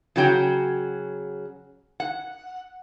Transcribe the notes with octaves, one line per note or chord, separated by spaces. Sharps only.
C#3 F#3 F#4 C#5 G5
F#5